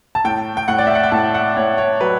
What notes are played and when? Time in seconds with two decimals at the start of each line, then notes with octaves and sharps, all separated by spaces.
0.15 A5
0.24 A2 G5
0.57 G5
0.68 A2 F#5
0.79 D5
0.87 E5
0.95 F#5
1.03 G5
1.12 A2 A5
1.35 F#5
1.56 A2 C#5
1.78 C#5
2.00 F#3 B4